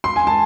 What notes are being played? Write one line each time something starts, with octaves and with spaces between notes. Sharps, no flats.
C6
G#5
A5